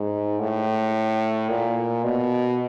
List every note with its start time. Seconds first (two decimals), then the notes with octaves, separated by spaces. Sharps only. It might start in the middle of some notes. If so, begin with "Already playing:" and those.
Already playing: G#2
0.39 A2
1.49 A#2
2.04 B2